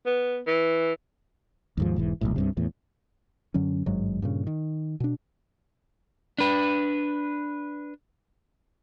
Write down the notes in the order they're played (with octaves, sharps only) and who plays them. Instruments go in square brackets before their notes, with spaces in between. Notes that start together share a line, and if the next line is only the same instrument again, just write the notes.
[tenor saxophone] B3
E3
[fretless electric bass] D#2 G#2 F3
E1 G#2 E3
D#1 B1 A2
C2 G2 C3
E2 A2
[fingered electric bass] F#2 D3 F#3 C#4
G#1 G2 F#3 G#3
G2 A#2 C#3
D#3
B2 D4
[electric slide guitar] D4 B4